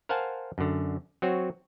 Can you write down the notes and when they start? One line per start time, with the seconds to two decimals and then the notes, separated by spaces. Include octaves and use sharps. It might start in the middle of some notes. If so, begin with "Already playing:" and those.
0.09 A#4 C5 F5 F#5 G#5 A5
0.58 F#2 D3
1.22 F#3 C4 F#4 C#5